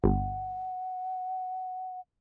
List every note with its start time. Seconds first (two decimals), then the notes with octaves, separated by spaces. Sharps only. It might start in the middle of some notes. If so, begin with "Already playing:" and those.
0.04 G1 F#5